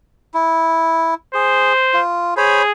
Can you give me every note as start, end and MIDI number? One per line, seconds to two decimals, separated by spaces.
0.34 1.14 64
1.35 1.73 68
1.35 2.01 72
1.94 2.34 65
2.37 2.72 68
2.37 2.62 72
2.37 2.62 73
2.37 2.62 83